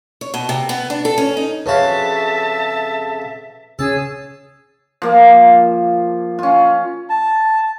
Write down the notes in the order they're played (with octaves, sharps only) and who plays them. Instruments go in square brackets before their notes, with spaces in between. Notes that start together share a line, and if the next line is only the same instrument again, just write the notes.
[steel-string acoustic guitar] C#5
B2
C3
B3
D4
A4
C#4
D#4
[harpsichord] F2 C#3 F#4 [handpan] B4 C#5 F5 [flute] E5 [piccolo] A5
[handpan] C#3 C#4 [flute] G#4 [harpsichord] A5 [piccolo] E6
[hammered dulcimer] F3 A#3
C#4 F4
[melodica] A5